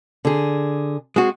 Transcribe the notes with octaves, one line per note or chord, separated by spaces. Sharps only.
D3 G#4
G#3 C4 F#4